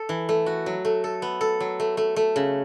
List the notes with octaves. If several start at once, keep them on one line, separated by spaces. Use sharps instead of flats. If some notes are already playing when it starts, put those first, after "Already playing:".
Already playing: A4
E3
A3
F#4
F#3
A3
A4
B3
A4
F#3
A3
A3
A3
C#3